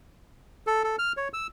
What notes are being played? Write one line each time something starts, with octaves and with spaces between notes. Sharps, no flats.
A4
A4
F6
C#5
E6